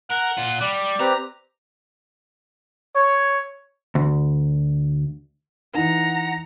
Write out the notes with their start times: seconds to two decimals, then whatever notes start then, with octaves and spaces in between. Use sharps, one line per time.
0.10 A#4 F#5
0.38 A#2 F4
0.61 G3 D5
1.00 C4 G4 B4 A#5
2.96 C#5
3.95 D2
5.75 E3 D#4 F#5 A#5